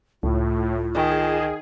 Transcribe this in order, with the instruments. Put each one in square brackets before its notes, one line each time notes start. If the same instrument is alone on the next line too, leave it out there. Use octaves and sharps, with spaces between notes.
[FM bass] C#2 [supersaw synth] A2 [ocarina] F4
[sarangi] D#3 [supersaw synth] G#4